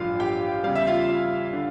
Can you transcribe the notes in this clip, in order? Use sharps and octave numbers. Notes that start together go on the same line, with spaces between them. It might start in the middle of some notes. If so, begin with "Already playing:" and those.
Already playing: A1 G2 D3 F3 F4 F5
G4 G5
E2 C#3 G3 F5
E5
F4 F5
D3